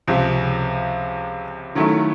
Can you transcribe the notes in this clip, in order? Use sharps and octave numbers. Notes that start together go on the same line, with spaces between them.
C#2 C3 F3
D#3 F#3 A3 C#4 E4